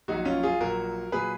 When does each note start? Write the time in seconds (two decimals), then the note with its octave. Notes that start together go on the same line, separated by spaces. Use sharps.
0.08 A#1 A#2 F#3 D#4 F#4
0.25 C#4 F4
0.43 F4 G#4
0.60 A#1 A#2 F#3 F#4 A#4
1.12 A#2 F#3 G#4 B4